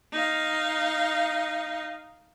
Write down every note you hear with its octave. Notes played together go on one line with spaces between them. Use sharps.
D#4 F5